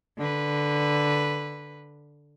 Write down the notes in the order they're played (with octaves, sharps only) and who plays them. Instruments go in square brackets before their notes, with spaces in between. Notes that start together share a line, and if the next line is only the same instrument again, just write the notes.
[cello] D3 B4